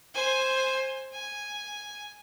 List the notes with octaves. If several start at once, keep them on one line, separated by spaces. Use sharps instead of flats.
C5 G#5
G#5